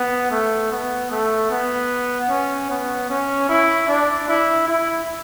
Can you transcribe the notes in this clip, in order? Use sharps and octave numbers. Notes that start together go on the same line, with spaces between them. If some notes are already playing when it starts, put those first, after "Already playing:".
Already playing: B3
A3
B3
A3
B3
C#4
B3
C#4
E4
D4
E4
E4